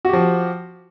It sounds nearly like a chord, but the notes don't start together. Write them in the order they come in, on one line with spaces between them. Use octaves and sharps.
F#4 G4 F3